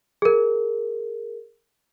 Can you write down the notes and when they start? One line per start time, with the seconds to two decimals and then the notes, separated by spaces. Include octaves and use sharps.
0.22 G#4 A#4